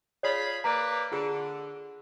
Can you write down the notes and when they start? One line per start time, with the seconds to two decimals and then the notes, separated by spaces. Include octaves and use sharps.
0.23 F4 G#4 C#5 D5 B5
0.64 A#3 B4 D5 A#5
1.12 D3 F4 G#4